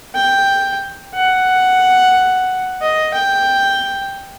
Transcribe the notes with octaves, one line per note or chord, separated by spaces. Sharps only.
G5
F#5
D#5
G5